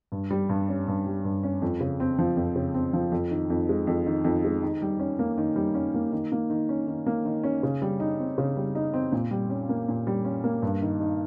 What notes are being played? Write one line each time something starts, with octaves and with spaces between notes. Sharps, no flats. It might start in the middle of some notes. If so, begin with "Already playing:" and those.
G2
G3
G2
C#4
G2
G3
G2
C#4
F2
C#3
C4
F3
F2
C#3
C4
F3
F2
D#3
F2
G#3
F2
D#3
F2
G#3
D#3
G3
C#4
A#3
D#3
G3
C#4
A#3
D#3
A#3
D#3
C#4
D#3
A#3
D#3
C#4
C#3
G3
D#4
C4
C#3
G3
D#4
C4
A#2
G3
C#4
A#3
A#2
G3
C#4
A#3
G2
D#3
D#4